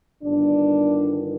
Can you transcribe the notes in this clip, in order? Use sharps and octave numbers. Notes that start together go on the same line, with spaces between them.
G1 G2 D#3 D4